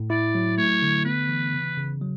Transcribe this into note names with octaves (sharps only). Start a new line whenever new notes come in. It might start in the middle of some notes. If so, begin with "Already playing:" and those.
Already playing: A2
E4 D5
F#3
A3 C#5
D3
B3 B4
E3
C#3
C#3
F#3